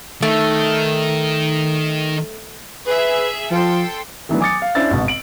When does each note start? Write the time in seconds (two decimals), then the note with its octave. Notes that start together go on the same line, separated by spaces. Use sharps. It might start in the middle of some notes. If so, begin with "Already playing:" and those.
0.22 D#3 A3
2.87 G#4 B4 E5
3.51 F3 A4 G5 C6
4.29 D#3 E3 F#3 A3 B3 D4
4.41 G#5 D6 D#6 A6 C#7
4.62 F5
4.75 C#4 D4 E4 C5 E6 A6
4.91 G#1 B2
5.08 D7 F#7